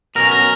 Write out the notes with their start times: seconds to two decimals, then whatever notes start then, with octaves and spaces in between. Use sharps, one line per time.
0.15 B2 F#3 C#4 A#4
0.31 A#4